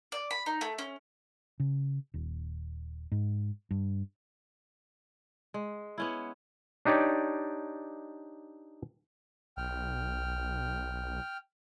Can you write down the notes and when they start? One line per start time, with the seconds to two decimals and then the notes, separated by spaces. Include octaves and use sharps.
0.12 D5
0.31 B5
0.46 D#4
0.61 A3
0.78 C#4
1.60 C#3
2.14 D#1
3.12 G#2
3.71 G2
5.54 G#3
5.98 B3 C#4 E4
6.85 D4 D#4 G4 C#5 D5
9.57 B1 G5 F6